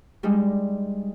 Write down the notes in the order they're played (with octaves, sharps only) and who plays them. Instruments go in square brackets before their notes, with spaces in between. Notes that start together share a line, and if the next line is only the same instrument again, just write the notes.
[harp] G3 G#3 D4 D#4